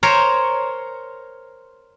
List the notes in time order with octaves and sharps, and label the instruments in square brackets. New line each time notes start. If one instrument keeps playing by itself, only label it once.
[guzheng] A#4 C5 C#5